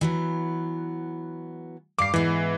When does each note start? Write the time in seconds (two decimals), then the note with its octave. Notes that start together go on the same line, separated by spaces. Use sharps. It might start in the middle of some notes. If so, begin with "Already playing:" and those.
0.01 E3 F#3 B3
1.99 G2 F5 D6 C7
2.14 G#2 E3 B3